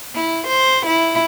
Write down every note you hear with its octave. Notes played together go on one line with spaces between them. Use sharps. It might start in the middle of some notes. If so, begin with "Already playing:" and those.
E4
C5
E4